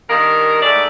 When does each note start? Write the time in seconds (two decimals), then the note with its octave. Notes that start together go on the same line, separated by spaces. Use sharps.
0.08 G2 D#3 A#4
0.62 G#2 A3 D5